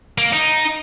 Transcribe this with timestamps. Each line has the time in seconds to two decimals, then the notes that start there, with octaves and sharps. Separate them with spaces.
0.18 A#3
0.33 D#4